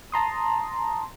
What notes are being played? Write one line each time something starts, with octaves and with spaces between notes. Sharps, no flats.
A5 A#5 C6 D#6